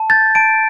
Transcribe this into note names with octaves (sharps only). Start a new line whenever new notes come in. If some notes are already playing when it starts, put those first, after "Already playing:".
Already playing: A5
G6 A6
A5 D7